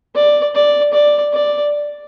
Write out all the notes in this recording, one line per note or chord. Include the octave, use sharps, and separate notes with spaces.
D5
D5
D5
D5